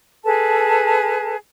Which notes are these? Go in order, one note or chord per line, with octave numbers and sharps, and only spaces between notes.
G#4 A4 B4 A5